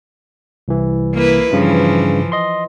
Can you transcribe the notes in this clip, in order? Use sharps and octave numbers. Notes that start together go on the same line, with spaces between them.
C2 E3
A#3 E4 B4
G2 C#3 E3 F3
D#5 C6